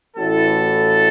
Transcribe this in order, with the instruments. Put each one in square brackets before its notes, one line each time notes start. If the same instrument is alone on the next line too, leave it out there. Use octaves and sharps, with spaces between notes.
[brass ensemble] A1 A2 E3 A3 F#4 A4